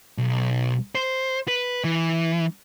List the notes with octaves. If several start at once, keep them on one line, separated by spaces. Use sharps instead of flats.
B1
C5
B4
E3